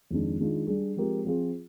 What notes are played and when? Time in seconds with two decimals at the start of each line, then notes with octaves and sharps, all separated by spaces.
0.11 F2 D#3 G#3 D4
0.39 D#3 G#3 D4 F4
0.67 G3 D4 G#4
0.96 F3 G#3 C4 G4 A#4
1.25 F3 C4 F4 G#4